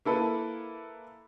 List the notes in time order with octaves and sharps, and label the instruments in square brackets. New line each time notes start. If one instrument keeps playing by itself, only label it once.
[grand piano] A#3 E4 A4 B4